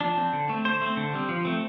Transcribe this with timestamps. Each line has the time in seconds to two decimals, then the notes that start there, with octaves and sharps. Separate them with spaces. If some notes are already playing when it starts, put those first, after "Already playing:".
0.01 F3 D4
0.17 C4
0.33 D3
0.49 A3 C4
0.65 D3 C5
0.81 A3 C4
0.97 D3
1.14 G3 C4
1.29 F3
1.45 A3 C4